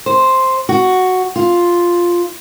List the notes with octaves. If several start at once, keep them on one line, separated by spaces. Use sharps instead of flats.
C5
F#4
F4